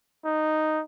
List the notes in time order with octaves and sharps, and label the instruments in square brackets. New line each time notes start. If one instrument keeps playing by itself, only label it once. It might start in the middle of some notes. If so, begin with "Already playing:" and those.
[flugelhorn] D#4